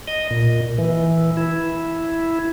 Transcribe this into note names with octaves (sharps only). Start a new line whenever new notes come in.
D#5
A#2
E3
E4